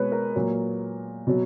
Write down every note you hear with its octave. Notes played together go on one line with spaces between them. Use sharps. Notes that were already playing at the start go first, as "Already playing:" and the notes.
Already playing: B2 G#3 B4 C#5
A#4
A#2 F#3
B2 F#3